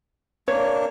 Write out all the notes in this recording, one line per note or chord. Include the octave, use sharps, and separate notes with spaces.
A#3 D4 C#5